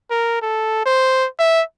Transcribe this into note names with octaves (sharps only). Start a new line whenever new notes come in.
A#4
A4
C5
E5